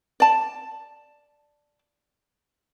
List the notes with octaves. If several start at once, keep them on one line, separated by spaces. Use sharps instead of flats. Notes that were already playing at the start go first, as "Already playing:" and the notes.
D5 A5